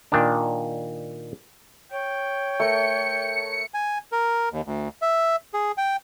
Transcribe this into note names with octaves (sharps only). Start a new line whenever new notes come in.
A#2 D#3 D4
C#5 G5
A3 A#4 C#7
G#5
A#4
D#2
D2
E5
G#4
G5